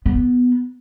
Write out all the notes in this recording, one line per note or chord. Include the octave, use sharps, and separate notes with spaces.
B3